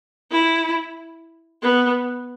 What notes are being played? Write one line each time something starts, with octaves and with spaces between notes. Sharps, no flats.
E4
B3